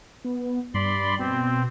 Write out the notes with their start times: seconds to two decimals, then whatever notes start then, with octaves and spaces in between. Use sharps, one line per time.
0.25 B3
0.74 G2 D5 B5 C6
1.19 B2 C4